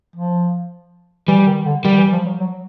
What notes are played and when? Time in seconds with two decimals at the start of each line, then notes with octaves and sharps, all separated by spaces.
0.16 F3
1.28 E3 G3
1.47 D#3
1.66 D3
1.84 D#3 G3
1.98 E3
2.12 F3
2.26 F#3
2.41 F#3